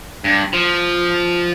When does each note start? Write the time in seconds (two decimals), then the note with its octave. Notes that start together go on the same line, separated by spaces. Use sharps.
0.24 G2
0.53 F3